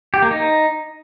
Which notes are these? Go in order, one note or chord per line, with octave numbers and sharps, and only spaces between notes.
G4
A#3
D#4